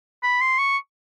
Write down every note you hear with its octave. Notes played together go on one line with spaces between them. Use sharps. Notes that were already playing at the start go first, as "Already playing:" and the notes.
B5
C6
C#6